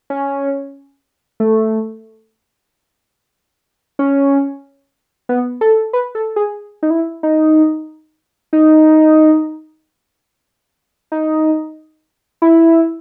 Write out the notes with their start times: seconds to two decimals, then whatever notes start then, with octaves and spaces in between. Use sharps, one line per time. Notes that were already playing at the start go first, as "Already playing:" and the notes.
0.10 C#4
1.40 A3
3.99 C#4
5.29 B3
5.61 A4
5.93 B4
6.15 A4
6.36 G#4
6.83 D#4
6.90 E4
7.23 D#4
8.53 D#4
11.12 D#4
12.42 E4